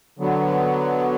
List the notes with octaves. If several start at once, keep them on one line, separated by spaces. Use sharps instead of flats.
D3 F#3 B3